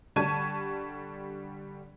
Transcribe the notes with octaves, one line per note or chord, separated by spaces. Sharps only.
D3 G3 A5 C#6 G#6 D#7